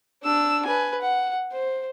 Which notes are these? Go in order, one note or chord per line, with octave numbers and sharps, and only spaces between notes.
D4 E6
B4 G#5
F#5
C5